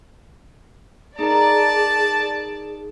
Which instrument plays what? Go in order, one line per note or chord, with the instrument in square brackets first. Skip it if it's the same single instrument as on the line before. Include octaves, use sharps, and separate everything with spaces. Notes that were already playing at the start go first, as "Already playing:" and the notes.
[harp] D#4 A#4 [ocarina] G#4 [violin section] D5 [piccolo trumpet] A5